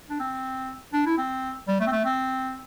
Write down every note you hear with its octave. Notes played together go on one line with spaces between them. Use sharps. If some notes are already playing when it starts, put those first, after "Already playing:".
D4
C4
D4
E4
C4
G3
A3
C4
A3
C4